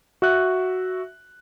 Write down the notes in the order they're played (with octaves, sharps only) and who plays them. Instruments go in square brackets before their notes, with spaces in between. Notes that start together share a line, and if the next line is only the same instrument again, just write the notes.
[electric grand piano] F#4 E5 F#6